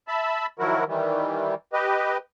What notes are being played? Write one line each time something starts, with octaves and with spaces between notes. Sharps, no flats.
E5 A5 B5
D#3 F3 F#3 E4 F#4 A#4
D#3 E3 G3
G4 B4 D#5